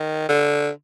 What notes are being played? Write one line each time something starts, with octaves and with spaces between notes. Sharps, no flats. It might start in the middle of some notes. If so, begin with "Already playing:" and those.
Already playing: D#3
D3